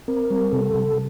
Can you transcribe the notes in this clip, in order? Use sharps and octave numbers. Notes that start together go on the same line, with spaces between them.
C4 A#4
G3
C3 A4
C3